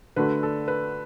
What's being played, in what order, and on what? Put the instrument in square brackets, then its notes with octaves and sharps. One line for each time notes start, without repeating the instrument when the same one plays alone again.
[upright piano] D3 A3 D4 F#4 [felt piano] B4
[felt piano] A4
B4